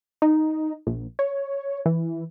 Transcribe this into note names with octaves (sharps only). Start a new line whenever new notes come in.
D#4
A#1
C#5
E3